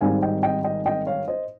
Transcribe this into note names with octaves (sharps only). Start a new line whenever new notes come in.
G#1 G#2 D#3 G3 C4 F5 G#5
D#5 G5
D#5 G5
D#5 G5
D#5 G5
C#5 F5
C5 D#5